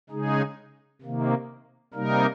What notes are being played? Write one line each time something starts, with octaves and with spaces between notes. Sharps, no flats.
C#3 G#3 D#4 G#4
C3 D#3 A#3
C3 G3 A#3 D#4 A#4